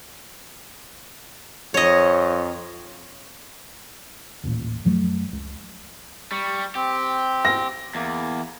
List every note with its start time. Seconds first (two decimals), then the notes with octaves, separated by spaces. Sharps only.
1.74 F2 C#5 D#5
4.43 D#1 A1 A#2
4.85 F#2 F3 F#3 A3
5.33 C#2
6.32 G3 C#6
6.75 C4 G4
7.45 A#6
7.95 E2 A#3